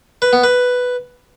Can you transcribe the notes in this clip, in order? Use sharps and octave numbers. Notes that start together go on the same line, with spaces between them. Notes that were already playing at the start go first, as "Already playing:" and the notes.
B4
B3
B4